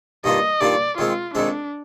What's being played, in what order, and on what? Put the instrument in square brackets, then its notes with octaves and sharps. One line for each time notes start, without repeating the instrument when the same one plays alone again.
[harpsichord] G2 D#3 A#3 D4 F4 [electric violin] D#5
[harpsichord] G2 D#3 A#3 D4 F4 [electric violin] D5
[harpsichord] F2 D#3 G#3 C4 [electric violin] F4
[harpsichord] F2 D#3 G#3 C4 [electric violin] D4